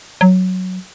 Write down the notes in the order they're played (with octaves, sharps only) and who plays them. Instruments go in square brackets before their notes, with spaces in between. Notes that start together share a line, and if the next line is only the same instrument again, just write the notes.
[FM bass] F#3